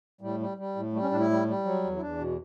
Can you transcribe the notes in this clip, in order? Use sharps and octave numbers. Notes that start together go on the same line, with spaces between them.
A2 G3
G3
G3
A2
G3 A3
C#4
A2 D4
E4
G3
G3
F#3
E2
E4
E2 D4
B2